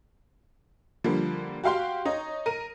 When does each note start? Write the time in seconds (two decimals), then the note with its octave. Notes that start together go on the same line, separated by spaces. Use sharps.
1.04 D3 F3 G3 A#3
1.64 F#4 G4 F5 G5 C6
2.05 D#4 C#5 D#5
2.46 A#4 D#7